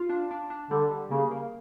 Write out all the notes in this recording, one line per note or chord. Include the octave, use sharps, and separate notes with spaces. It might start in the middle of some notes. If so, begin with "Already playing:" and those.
Already playing: F4
D4
D4
D4
D3 G3
G3
C#3 A#3
A#3